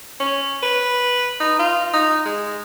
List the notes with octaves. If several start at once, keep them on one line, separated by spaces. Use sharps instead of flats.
C#4
B4
D#4
F4
D#4
G#3